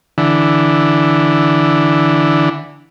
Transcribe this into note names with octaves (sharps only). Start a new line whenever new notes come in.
D3 E3